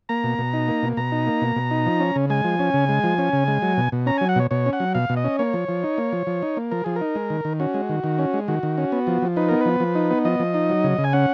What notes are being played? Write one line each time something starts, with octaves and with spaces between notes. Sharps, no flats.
A#3 A#5
B2
B2
D#4
A#3
B2
B2 A#5
D#4
A#3
B2
B2
D#4
F3
C#4
C#3
G#3 G#5
F3
C#4
C#3
G#3
F3
C#4
C#3
G#3
F#3
B2
B2
C#4 A#5
F#3 G#5
F#5
B2 C#5
B2 C#5
C#4
F#5
F#3
B2 F5
B2
D#5
C#4
A#3 C#5
F3
F3
D#4
A#3
F3
F3
D#4
A#3
F3 A#4
F3 G#4
A#4
D#4
G#3
D#3
D#3
C#4 F#4
G#3
D#3
D#3
C#4
G#3
D#3 F#4
D#3
C#4
B3
F3
F3
D#4 B4
B3 A#4
F3 B4
F3
D#4
B3
F3 D#5
F3
D#4
F#3
C#3
C#3
G#5
C#4 F#5